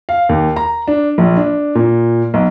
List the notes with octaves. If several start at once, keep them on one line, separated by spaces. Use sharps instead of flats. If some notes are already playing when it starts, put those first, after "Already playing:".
F5
D#2
A#5
D4
A#1
D4
A#2
B1